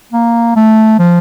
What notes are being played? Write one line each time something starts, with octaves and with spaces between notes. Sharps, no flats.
A#3
A3
F3